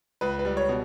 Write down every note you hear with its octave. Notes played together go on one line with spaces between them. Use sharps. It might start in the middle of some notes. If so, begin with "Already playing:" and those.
C#2 B4
B4
G3
C#5
B2